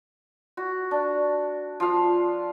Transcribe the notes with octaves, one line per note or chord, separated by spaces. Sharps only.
F#4
D4
F3 F5